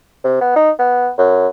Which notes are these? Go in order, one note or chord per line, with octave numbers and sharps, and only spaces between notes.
C3
B3
D#4
B3
F#2